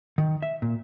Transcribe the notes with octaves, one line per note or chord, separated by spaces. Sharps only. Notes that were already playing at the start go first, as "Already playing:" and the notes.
D#3
E5
A#2